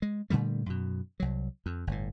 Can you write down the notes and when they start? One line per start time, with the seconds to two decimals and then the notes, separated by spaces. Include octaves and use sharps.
0.02 G#3
0.30 A#2 D3 G3 A3
0.66 F#2 B2
1.20 C2 F#3
1.66 F2
1.87 G1 A2